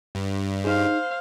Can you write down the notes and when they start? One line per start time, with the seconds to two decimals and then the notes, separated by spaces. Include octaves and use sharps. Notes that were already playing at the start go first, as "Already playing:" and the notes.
0.15 G2
0.64 D#4 G#4 C5 F5